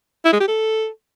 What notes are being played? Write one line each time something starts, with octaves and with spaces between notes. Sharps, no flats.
E4
G#3
G4
A4